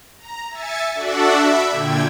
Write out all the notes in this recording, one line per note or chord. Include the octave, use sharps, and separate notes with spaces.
A#5
E5 G#5 A6 C#7
D4 F#4 A4 D5 E5 F#5
E5 B5 D6
A#2 D3 G5 G#6